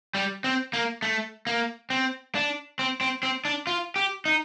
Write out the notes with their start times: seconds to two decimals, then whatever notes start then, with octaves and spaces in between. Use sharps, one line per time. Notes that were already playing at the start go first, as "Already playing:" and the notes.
0.15 G3
0.44 C4
0.73 A#3
1.02 A3
1.47 A#3
1.90 C4
2.35 D4
2.79 C4
3.01 C4
3.23 C4
3.45 D4
3.67 F4
3.96 G4
4.26 D#4